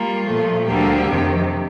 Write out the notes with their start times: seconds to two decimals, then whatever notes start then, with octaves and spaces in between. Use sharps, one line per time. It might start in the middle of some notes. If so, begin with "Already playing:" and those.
Already playing: G3 A#3 F4
0.25 A#2 F3 A3
0.66 D2 D3 G3 A#3 G4
1.06 F2 C3 D#3